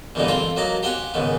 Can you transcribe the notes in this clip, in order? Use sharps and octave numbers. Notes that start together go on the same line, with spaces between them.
E2 G2 A#2 D3 G#3 D#4
C4 F4 A4 C5 C6
F#3 A#3 D#5 A5 A#5
G4 C5 F5 F#5 G#5
C#2 G#2 D#3 B3